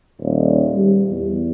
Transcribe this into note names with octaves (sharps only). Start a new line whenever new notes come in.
D#1
G3
E2